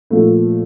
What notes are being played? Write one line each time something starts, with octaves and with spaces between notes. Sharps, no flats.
A#2 F3 A3